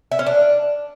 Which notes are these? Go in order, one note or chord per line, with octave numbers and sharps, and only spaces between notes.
E5
C#4
D4